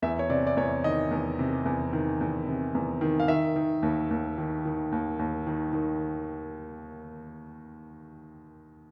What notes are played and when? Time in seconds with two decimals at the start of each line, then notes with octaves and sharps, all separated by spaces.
0.02 E2 E5
0.19 C#5
0.30 C3 D5
0.47 D5
0.57 E2 C#5
0.84 D#3 D#5
1.11 E2
1.39 C3
1.65 E2
1.93 D#3
2.21 E2
2.47 C3
2.75 E2
3.01 D#3
3.20 F5
3.28 D#3 E5
3.56 D#3
3.83 D#2
4.11 D#2
4.38 D#3
4.65 D#3
4.92 D#2
5.19 D#2
5.47 D#3
5.73 D#3